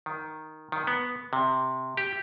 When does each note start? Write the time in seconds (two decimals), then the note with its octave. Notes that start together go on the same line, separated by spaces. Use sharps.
0.06 D#3
0.72 D#3
0.87 B3
1.33 C3
1.97 G4